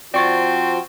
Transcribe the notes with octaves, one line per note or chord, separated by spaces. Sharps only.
F3 C4 F4 F#4 D5 C#6 A6